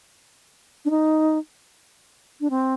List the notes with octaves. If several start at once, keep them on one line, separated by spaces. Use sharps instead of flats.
D4
D#4
D4
C4